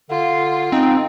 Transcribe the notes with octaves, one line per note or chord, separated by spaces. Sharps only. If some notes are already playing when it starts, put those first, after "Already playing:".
D3 F4
C4 D#4